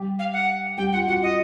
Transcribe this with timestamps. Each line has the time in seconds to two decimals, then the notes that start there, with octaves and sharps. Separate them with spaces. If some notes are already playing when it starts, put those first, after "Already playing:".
Already playing: G3 G4
0.19 F5
0.33 F#5
0.78 G3 G4 G5
0.93 F4 F#5
1.07 F#4 F#5
1.22 F4 D#5